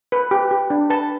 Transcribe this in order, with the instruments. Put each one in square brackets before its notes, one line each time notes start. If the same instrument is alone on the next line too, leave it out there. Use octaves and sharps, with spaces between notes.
[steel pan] B4
G4
G4
D4
B4 A5